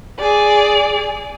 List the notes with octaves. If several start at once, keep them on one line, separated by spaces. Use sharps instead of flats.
G#4 D5